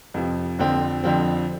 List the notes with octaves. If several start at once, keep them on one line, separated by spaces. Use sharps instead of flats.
F2 C3 F3
F2 D3 F3 C4
F2 D3 F3 C4